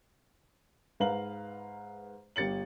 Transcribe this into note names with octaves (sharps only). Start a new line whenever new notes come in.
G#2 B4 F5 A#5 F#7
G1 G4 A6 C#7 F#7